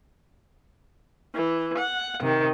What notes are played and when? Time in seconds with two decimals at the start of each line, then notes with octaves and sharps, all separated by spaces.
1.34 E3
1.78 F#5
2.20 C3 D#3